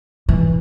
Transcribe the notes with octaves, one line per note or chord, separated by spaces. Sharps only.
E3